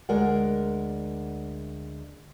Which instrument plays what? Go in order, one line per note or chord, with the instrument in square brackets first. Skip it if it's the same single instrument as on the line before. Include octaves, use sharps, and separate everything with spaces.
[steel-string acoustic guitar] D2 G#3 A#4 D5 F#5